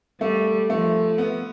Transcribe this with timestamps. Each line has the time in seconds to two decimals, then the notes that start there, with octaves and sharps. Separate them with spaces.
0.20 G3 A3
0.70 F3 A3
1.18 B3